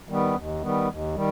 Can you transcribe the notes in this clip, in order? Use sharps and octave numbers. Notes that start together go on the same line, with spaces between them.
D#3 G3 B3
D#2
D#3 G3 B3
D#2
D#3 G3